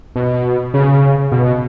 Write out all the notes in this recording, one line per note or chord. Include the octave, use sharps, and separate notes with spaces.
B2
C#3
B2